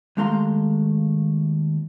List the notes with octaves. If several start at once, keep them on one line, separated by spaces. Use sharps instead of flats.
D#2 G#3 A3 F5 A#5 C6